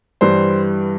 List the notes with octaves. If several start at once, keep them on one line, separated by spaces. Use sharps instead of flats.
G2 E3 G3 C5